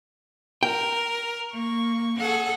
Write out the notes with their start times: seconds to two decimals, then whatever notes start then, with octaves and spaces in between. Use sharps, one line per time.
0.63 A#4 G5
1.53 A#3 C#6
2.18 G#4 A4 F#5